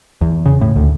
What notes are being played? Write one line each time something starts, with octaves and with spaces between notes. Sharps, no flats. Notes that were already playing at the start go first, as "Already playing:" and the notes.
E2
C#3
A2
D2